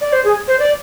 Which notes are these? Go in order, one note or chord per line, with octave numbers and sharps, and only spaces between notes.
D5
C5
G#4
C5
D5